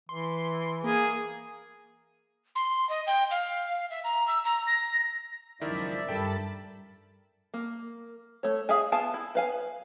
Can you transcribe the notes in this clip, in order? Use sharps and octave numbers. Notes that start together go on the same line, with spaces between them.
E3 C6
A#3 G#4
C6
D#5
G5
F5
E5
A#5
E6
A#5
A#6
C#2 F#2 D#3 F3 E4 A#4 D5 E5
G2 A4 A#4 G5 A5 B5
A#3
A3 C#5
G#4 E5 F5 G#5
B3 F4 F5 G#5 A5
E4
B4 F5 G#5